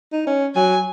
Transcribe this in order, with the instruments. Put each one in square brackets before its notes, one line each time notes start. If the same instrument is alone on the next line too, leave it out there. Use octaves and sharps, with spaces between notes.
[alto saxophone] D#4
C#4
[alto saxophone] F#3 [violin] G#5